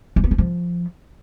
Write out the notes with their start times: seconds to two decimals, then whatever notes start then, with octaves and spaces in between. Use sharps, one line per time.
0.16 G#3
0.24 B3
0.31 E3
0.38 F3